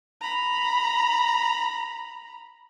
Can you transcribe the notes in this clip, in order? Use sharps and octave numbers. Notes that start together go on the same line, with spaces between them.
A#5 B5